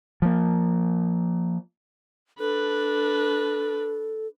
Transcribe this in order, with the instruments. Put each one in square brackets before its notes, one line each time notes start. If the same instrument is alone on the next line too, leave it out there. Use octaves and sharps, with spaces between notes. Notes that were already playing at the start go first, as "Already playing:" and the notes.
[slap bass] F3 A#3
[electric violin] D4 B4 [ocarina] A4